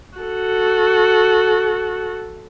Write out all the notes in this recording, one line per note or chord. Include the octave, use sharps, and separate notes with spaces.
F#4 A4